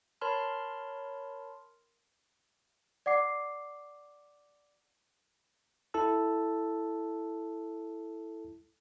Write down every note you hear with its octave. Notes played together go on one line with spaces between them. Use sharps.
A#4 C#5 A5 B5 C6 F6
D5 F#5 D6 C7
E4 A4 A5 E6